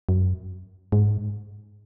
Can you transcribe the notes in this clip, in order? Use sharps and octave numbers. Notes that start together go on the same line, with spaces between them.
F#2
G#2